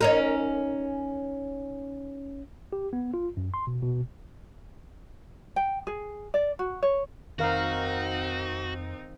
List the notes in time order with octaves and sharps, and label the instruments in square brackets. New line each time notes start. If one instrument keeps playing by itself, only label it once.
[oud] C#4 D#4 A#4
[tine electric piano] G4
B3
F4
F#2
C6
B2
B2
[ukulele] G5
G#4
D5
F#4
C#5
[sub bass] F2 [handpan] D#3 A#4 F5 [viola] C4 D#4 [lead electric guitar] F#4